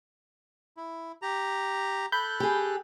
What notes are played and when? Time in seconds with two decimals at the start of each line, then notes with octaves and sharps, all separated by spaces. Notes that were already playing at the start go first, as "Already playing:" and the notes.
0.77 E4
1.22 G4 A#5
2.12 A4 B5 F#6 G6
2.40 G4 G#4